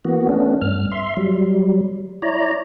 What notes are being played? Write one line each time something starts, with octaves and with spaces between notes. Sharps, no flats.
E3 A#3 B3 F#4
A3 B3 C#4 D4
G2 F6
E5 C6
F#3 G3
E4 C#5 D5 A#5